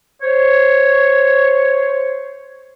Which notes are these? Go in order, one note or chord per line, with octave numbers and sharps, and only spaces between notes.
C5 C#5